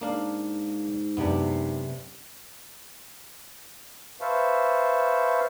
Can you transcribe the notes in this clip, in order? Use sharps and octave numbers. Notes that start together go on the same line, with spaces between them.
G#2 A#3 D4 F5
F#2 C3 B3 D4
B4 C5 E5 F5 A5 C#6